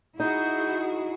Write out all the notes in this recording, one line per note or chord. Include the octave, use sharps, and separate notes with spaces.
D#4 E4 F#4 G#4 G6